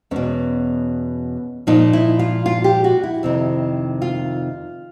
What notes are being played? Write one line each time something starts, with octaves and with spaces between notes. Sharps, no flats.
E2 B2 C#4
A#2 F3 D#4
E4
F4
F4
G4
F#4
E4
F2 C3 D#3
F4